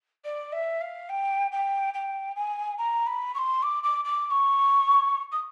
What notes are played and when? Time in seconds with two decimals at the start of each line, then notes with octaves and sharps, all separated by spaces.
0.24 D5
0.52 E5
0.81 F5
1.09 G5
1.51 G5
1.94 G5
2.36 G#5
2.78 A#5
3.06 B5
3.34 C#6
3.38 C6
3.62 D6
3.83 D6
4.04 D6
4.26 D6
4.30 C#6
5.32 D#6